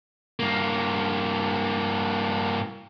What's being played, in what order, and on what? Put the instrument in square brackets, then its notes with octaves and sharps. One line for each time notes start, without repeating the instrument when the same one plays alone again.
[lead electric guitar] G2 A#3